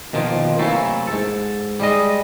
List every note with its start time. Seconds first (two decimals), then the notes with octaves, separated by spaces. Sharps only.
0.13 B2 D#3 F3 A#3
0.59 C3 E3 F#3 A3 A#3
1.07 G#2 A4
1.80 G3 G#3 D#5